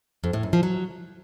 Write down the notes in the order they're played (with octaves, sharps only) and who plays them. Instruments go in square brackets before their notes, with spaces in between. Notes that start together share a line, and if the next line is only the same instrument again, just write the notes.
[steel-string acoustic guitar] F2
A2
F#2
F3
F#3